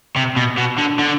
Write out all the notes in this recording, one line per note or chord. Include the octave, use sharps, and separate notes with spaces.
C3
B2
B2
D3
D3